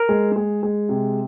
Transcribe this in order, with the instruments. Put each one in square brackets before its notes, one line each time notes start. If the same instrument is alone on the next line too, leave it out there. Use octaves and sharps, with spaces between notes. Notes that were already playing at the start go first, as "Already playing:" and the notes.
Already playing: [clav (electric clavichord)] A#4
[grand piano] G#3
G#3
G#3
C3